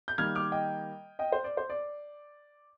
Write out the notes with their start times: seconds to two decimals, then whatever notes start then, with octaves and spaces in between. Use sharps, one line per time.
0.08 G6
0.18 D#3 G3 A#3 F6 G#6
0.35 D6 F6
0.52 D#5 G5
1.19 D#5 G5
1.32 C5
1.44 D5
1.57 C5
1.70 D5